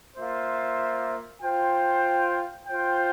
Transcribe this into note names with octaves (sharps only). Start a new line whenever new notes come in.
A#3 F4 C5 E5
F4 C5 G5
F4 C5 G5